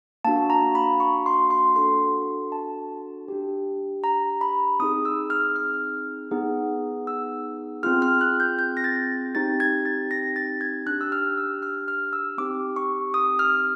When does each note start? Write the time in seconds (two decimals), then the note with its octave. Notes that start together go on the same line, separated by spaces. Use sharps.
0.25 A#3 D4 F#4 A5
0.50 A#5
0.75 B5
1.00 C#6
1.26 C6
1.50 C6
1.76 D4 F#4 A4 C6
2.52 A5
3.28 D4 G4
4.04 A#5
4.41 B5
4.80 C4 D#4 G#4 D#6
5.05 E6
5.30 F6
5.56 F6
6.31 B3 D#4 G#4
7.07 E6
7.83 C4 F4 G#4 F6
8.02 F6
8.21 F#6
8.40 G6
8.59 G6
8.77 A#6
8.84 A6
9.35 C4 D#4 G4 A6
9.60 G#6
9.86 A6
10.11 A#6
10.36 A6
10.61 G#6
10.86 D4 F#6
10.91 G4
11.01 E6
11.12 F6
11.38 E6
11.62 F6
11.88 F6
12.13 E6
12.38 C4 D#4 G4 D6
12.76 C#6
13.14 D#6
13.39 F6